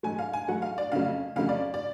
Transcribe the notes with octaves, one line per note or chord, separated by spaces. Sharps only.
G#2 F#3 A3 G#5
F5
G#5
G#2 F#3 A3 F#5
F5
D5
F2 C#3 F#3 A3 F5
F2 C#3 F#3 A3 F5
D5
D5